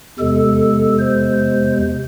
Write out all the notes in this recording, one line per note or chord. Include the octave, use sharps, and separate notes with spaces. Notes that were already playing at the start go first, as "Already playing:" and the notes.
E2 C3 G#3 A4
C5